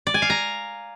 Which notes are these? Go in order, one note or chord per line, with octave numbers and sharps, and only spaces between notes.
D5
G#5
F5
A#5